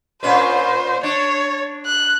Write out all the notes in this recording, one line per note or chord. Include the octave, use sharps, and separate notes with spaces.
A#2 C#4 B4 C5
D4 C#5
F#6